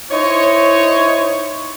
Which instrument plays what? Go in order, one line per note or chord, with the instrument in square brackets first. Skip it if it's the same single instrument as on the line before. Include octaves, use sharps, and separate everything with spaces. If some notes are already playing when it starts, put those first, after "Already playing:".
[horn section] D#4 E4 C5 C#5